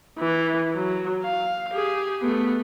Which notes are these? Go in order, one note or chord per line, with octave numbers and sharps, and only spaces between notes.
E3
F#3
F5
G4 G#4
A3 B3